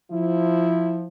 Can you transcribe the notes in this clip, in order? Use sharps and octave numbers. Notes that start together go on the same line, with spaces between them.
F3 E4